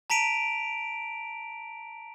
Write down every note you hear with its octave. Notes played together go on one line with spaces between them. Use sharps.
A5 A#5 B6 D7 D#7 F7